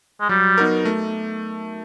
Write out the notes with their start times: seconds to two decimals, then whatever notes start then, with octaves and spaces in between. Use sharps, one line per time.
0.21 G#3
0.29 F#3 G3
0.58 B3 D#4 F#4 A#4
0.85 A3